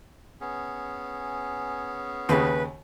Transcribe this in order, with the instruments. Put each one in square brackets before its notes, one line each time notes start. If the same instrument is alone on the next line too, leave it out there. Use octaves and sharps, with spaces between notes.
[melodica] B3 C#4 G#4
[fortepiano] D#2 C#3 [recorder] B4